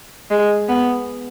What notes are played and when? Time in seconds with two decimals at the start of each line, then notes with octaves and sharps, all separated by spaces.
0.31 G#3
0.69 B3